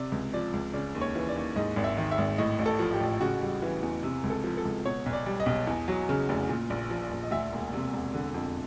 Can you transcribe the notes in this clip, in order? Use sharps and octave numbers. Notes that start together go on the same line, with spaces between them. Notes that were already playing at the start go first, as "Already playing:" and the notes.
Already playing: C3 D5
C#2
F3 D5
C#2
C#3 D5
D#2
C#5
E3
D5
D#2
G#2 D#5
G#1
E5
D#3
E5
G#1
A2 D#5
A1
A4
F3
G4
A1
C#3 F#4
G3
E3
E2
C3
C#2
A4
F3
A4
C#2
B2 C#5
B1
D5
G3
D#5
B1
E2
F#3
C#3
F1
A#2
A#1
F3
A#1
D#5
D2 E5
E1
C3
E1
D3
F2